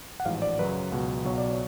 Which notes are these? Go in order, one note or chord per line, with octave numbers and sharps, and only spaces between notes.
F#5
A1 G#2 F3 F5
D5
F#2 C#3 F#3 B4
C#2 B2 F#3
B1 B2 F#3 C#5
D5
C#5